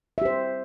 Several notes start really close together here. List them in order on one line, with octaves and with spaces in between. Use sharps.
E5 G4 C5